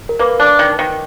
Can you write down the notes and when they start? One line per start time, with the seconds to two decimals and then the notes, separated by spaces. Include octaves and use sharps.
0.09 A#4
0.19 A#3 B4
0.40 D4
0.59 D#3
0.79 D#3